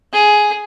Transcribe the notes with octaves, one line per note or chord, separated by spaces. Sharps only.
G#4